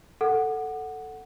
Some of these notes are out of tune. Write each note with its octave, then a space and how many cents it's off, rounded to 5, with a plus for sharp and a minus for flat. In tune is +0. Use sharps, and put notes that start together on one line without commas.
A4 +5 F#5 +0